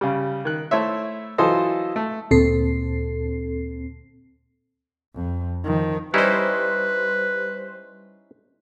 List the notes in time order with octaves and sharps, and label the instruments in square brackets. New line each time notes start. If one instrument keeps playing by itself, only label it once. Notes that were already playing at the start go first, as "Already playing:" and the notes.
[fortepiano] C#3 G3
D#3 F#6
A3 E4 C5 C#5 E5
E3 F#3 F4 A4 C5 D#5
A3
[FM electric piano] D2 A#2 C4 A4 C7
[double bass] F2
D#3 F3
[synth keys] G3 C5 [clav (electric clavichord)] C#4 D#4 E4 [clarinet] B4